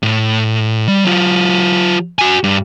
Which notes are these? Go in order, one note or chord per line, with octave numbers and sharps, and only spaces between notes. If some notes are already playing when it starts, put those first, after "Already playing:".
A2
G3
F#3 F4
F#4 G#5
G2